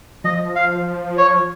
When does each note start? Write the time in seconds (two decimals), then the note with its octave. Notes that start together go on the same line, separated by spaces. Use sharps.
0.24 F3 D#5
0.56 F5
1.17 C#5